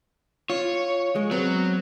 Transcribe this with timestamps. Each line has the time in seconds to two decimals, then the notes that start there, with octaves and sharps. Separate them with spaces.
0.50 F4 C#5
1.16 G#3
1.31 F#3 B3 C4